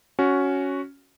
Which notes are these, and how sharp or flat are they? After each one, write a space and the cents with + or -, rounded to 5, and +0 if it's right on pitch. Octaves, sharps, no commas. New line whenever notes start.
C#4 +5 F#4 +0